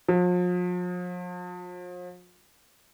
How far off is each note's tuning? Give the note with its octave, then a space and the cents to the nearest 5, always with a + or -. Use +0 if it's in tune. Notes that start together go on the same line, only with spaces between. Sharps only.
F3 +40